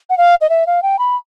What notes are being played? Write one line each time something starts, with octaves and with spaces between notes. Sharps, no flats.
F#5
F5
D#5
E5
F5
G5
B5